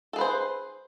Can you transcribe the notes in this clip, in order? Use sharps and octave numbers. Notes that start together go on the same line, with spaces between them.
G#4 A4 B4 C5